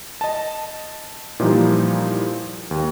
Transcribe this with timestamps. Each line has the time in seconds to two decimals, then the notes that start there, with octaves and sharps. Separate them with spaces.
0.21 D#5 A5
1.40 A#2 E3 F3 G3 D#4 G4
2.71 D#2